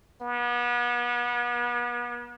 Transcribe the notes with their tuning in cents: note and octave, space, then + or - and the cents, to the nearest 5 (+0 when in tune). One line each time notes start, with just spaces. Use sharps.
B3 -35